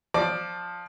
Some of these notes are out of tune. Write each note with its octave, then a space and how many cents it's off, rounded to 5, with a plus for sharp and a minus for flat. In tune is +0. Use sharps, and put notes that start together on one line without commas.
F3 +15 D5 +10